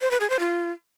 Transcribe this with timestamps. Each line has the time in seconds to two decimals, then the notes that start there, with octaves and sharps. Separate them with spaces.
0.01 C5
0.11 B4
0.20 G#4
0.30 C5
0.39 F4